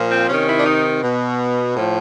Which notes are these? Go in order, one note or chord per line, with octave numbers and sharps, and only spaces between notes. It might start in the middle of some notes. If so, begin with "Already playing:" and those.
Already playing: A#2 F3
C4
C3 D#3 C#4
E4
D4
D#4
B2
A2 F3